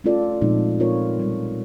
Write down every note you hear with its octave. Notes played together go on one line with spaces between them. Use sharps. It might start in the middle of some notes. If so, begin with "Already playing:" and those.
A3 C#4 F4 A4 D5
A#2 F3 G#3 C4 D#4
C4 F4 A#4 C#5
B2 G3 C4